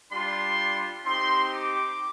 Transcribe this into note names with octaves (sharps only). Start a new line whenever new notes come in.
G3 D4 F4 C6
C4 D#4 G4 C6
D6